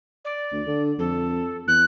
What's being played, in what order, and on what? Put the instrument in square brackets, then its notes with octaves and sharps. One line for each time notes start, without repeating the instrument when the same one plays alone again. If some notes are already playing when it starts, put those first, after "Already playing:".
[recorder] D5
[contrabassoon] D2
D3
[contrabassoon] F2 [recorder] A4
[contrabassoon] E2 [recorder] F#6